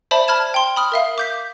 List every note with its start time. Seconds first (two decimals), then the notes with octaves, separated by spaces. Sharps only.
0.11 C5 D5 E5 A5 B5
0.28 A5 B5 F6 G#6 E7
0.54 G5 C6
0.76 B5 D#6 F6
0.92 A#4 E5 F5
1.18 D6 G6 B6